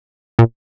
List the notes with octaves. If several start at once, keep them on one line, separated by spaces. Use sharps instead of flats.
A#2